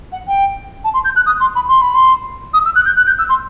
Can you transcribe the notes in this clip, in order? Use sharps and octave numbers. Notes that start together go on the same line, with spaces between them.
F#5
G5
A5
C6
G6
F#6
D#6
C6
B5
C6
B5
C6
D#6
E6
F#6
G6
F#6
G6
E6
C6